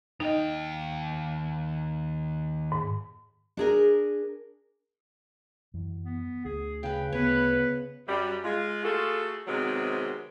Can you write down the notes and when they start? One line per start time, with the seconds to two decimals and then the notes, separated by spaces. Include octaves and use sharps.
0.20 D#2 D#4 D#5 G5
2.72 G#2
3.57 D4 G#4 A#4
5.74 F#2 E3
6.05 B3
6.45 D2 G#4
6.83 C#3 B4 G5
7.13 D2 B3 B4 C#5
8.08 F#2 G3
8.44 G#3 F4
8.84 A3 F4 F#4 G#4 A4
9.47 C3 D#3 F#3 G#3 B3 C4